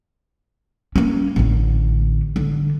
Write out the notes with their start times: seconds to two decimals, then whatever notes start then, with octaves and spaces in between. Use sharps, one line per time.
0.96 A#3 C#4
1.36 A1 D3
2.36 D3